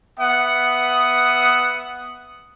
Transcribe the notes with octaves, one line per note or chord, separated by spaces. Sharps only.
B3 E5 F#5 D#6